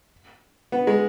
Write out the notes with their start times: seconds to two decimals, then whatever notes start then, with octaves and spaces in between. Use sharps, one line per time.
0.72 B3
0.87 G#3